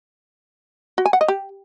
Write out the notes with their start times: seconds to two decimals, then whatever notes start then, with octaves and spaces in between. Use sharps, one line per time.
0.98 F#4
1.06 G#5
1.13 F#5
1.21 D#5
1.28 G4